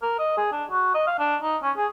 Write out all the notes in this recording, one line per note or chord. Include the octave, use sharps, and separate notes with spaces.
A#4
D#5
G#4
D4
F#4
D#5
F5
D4
D#4
C#4
G#4